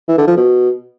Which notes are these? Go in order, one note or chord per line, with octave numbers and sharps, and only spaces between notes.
E3
D3
F3
B2